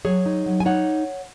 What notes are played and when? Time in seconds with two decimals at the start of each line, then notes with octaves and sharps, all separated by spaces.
0.05 F#3 G#4 C#5
0.26 D#4
0.46 F#3
0.60 G#5
0.65 D#4 C#5 F#5